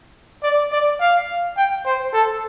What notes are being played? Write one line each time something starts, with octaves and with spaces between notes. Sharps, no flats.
D5
D5
F5
G5
C5
A4